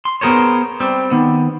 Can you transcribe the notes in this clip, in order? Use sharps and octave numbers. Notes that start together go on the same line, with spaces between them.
C6
B3 G#4 A#4 C5 C#5
G3 C4
D#3 B3